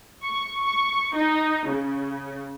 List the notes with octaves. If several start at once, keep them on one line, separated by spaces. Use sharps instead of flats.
C#6
C#6
D#4
C#3